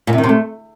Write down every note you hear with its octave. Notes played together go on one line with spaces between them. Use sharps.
A#2
C3
D#3
C3
A3